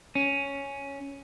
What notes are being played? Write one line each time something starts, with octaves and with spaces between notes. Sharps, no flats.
C#4